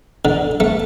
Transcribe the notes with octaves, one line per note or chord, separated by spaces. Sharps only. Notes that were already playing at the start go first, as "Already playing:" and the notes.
D3
A3